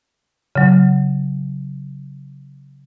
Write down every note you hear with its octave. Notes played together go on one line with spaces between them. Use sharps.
C#3 F#3